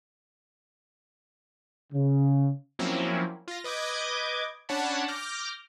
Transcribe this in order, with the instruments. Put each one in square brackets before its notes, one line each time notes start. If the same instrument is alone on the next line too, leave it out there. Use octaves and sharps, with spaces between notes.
[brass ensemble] C#3
[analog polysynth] F3 F#3 A#3 C4 C#4 E4
F4 A#6
B4 D#5 D6 G6 G#6
C#4 D4 C#5 F#5 A5 B5
D6 F6 G6 A#6